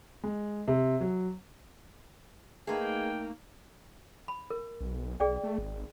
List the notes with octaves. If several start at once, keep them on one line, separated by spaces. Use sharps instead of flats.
G#3
C3
F#3
A3 A#3 D#4 G#4 B4 G5
B5
A#4
B1
B1 G#4 D5 G5
A3
G#1